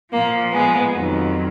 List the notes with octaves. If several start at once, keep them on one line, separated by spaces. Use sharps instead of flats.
A#2 F3 A#3
G#3 B3
F2 D#3 F#3